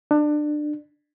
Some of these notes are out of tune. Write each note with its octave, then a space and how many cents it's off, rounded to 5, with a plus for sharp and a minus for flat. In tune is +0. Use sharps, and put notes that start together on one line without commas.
D4 +25